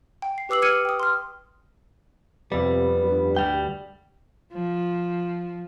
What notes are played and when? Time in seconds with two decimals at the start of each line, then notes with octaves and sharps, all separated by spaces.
0.22 G5
0.38 C7
0.49 G4 B4 D6 E6 C7 F#7
0.62 D6 E6 F6 G#6 C#7 D#7
0.85 G5 D#6
1.00 C6 F6
2.52 F2 C3 G3 B3
3.02 G2
3.36 D2 G3 G5
4.54 F3